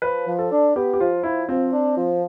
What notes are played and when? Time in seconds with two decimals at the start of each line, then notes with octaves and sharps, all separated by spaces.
0.02 F3 B4
0.27 F3
0.39 A4
0.51 D4
0.75 B3 G4
0.94 G4
1.00 F3 F4
1.23 F3 E4
1.48 F3 C4
1.73 D4
1.97 F3